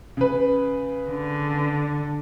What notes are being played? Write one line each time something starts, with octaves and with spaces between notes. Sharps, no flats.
C#3 B4
D3